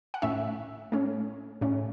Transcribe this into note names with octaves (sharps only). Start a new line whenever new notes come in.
F#5
A2 A3 C#4 E5
A2 A3 C#4
A2 A3 C#4